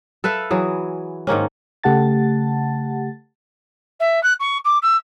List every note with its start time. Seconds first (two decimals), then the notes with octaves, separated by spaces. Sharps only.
0.24 A4 B4 E5 F5
0.50 E3 F#3 G#4
1.27 G#2 D#3 A#3 C#4
1.84 C#3 A3 G4 F#5 A5 A6
4.00 E5
4.23 F#6
4.40 C#6
4.65 D6
4.82 E6